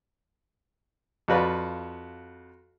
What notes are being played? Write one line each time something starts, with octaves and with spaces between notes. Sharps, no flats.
F2 F4 F#4 B4 D5